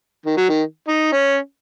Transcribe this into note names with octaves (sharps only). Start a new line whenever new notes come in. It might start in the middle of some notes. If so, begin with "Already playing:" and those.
D#3
F#3
D#3
D#4
C#4